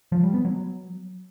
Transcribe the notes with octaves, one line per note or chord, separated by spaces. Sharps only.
F3
G3
B3
F#3